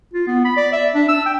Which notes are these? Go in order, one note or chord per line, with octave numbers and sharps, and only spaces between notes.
F4
B3
B5
D5
E5
D4
E6
G5